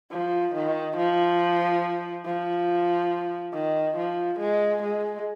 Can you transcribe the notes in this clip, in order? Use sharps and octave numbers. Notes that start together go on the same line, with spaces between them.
F3
D#3
F3
F3
D#3
F3
G#3
G#3